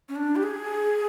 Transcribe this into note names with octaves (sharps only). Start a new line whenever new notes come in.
C#4
D4
G4
G#4